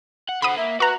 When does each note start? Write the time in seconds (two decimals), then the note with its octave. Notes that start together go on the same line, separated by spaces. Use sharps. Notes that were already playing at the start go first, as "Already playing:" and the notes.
0.29 F#5
0.42 D3 C5 F#5 B5 D#6
0.57 A#3 E5
0.80 F#4 B4 A#5 C#6